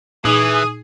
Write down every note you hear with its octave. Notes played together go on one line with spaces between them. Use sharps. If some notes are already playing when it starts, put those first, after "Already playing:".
A#2 E3 D#4 G#4 D#6